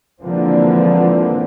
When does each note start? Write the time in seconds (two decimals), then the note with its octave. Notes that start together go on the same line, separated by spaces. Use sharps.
0.21 D3 E3 F3 G#3 A#3 C4